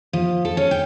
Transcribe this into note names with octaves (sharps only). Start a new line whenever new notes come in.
F3
A4
C#4
G5